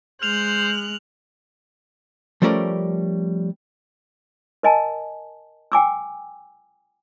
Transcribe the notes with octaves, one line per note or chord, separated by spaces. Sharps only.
G#3 C5 F6 F#6 F7 F#7
F3 G3 A3 C#4 A#4 D5
A#4 D#5 G#5 A5
G5 G#5 D6 E6